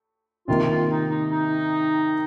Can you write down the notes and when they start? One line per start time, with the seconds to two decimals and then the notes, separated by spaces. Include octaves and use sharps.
0.48 C3 D#3 A#3 F4
0.69 F4
0.90 D#4
1.10 D#4
1.31 D#4